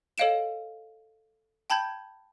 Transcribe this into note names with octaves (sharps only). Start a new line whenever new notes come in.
A4 C#5 D#5 F5 D7 E7
G5 A5 B5 G6 G#6